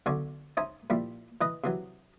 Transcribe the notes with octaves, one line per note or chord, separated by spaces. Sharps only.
B1 D3 C#4 D4 C#5 C6
C#4 D#4 C5 E5 G#5
A#2 F3 G3 E4
E3 B4 D#5
C3 E3 F#3